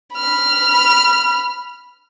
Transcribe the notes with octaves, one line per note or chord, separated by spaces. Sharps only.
B5 F6